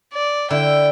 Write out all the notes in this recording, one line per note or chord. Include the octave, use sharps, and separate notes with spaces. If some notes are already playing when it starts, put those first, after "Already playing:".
D5
D3 E4 G5